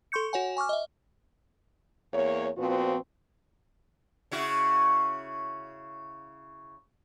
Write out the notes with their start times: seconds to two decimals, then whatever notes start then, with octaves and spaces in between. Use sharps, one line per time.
0.12 A4 C6 C#6 G6 C#7
0.33 F#4 C#5 F#5 G#5
0.57 G#5 C#6 D6 F6
0.69 D#5 E5
2.13 E2 A#3 C#5
2.58 A#2 F3 B3 C4 F#4
4.32 C#3 E4 F#4